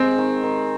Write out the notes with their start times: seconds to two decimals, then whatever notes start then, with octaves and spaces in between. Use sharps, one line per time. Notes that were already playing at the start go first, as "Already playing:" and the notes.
Already playing: G#3 C4
0.18 D#3
0.43 D#3